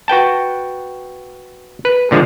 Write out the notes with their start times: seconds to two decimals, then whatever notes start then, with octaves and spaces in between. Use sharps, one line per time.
0.08 F#4 B4 G5 A5
1.85 B4
2.11 A#2 D3 F3 G#3